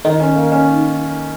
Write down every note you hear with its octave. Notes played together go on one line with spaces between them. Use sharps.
D#3 D#4
C#4
A#3
C#4